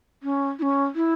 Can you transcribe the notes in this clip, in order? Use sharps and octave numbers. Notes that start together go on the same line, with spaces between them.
C#4
E4
C#4
E4